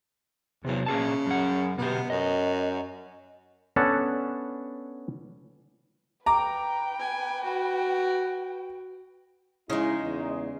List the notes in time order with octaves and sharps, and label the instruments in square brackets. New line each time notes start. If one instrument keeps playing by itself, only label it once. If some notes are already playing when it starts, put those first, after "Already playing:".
[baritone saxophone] E2 [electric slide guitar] C3 F#3
[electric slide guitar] A#2 G#4 A5 [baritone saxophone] C#3
[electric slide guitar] F#2 F#5
[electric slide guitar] B2 G4 [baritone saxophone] B3
[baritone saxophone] F#2 [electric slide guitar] D#5
[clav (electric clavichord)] B3 C#4 D4 A4 F#5 A5
[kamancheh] B4 G5 [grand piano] A#5 D6
[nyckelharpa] G#5
F#4
[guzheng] C#3 G#3 [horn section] D#4 [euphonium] E4
[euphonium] E2